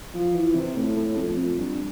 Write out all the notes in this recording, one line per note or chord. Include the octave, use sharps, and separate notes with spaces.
F3
E3
C3
A2
A2
F2
F2
G2